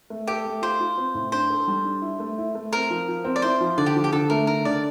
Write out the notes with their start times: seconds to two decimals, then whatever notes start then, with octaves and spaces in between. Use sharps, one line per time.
0.10 A3
0.27 G4 A4
0.45 A3
0.62 F4 C5
0.80 F4
0.98 C4
1.14 A2
1.32 D4 C5
1.50 A4
1.68 G3
1.84 D4
2.02 E4
2.20 A3
2.38 E4
2.55 A3
2.73 C4 A#4
2.90 F3
3.08 F3
3.24 C4
3.36 D5
3.42 E4 C5
3.60 F3
3.77 D3 D5
3.86 G4
3.96 F3
4.04 G4
4.12 D3 A4
4.30 A3 A#4
4.47 D3 A#4
4.65 D3 D5